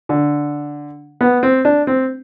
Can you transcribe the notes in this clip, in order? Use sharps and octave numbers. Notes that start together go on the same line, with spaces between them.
D3
B3
C4
D4
C4